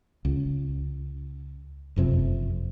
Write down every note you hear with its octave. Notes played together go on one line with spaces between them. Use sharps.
C#2
F#1 F2 C3